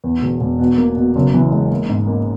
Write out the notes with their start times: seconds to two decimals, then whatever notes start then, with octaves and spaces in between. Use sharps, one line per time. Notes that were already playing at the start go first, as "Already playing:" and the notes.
0.04 E2
0.22 E1
0.41 E1
0.59 B2
0.78 A#3
0.97 B2
1.16 F#1
1.34 E3
1.52 G#3
1.71 A#3
1.89 G#2
2.07 A#3